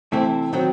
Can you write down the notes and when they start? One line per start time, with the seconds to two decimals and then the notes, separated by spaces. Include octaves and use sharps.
0.12 C3 E3 A3 C4 E4
0.53 D#3 F#3 C4